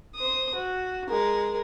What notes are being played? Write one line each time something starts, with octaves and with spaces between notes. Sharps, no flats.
C5 D#6
F#4
G#3 A#4